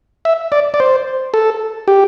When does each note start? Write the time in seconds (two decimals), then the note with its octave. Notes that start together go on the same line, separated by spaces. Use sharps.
0.25 E5
0.52 D5
0.74 D5
0.80 C5
1.34 A4
1.88 G4